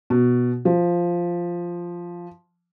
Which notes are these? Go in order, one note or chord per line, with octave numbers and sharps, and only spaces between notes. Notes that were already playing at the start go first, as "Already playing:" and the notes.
B2
F3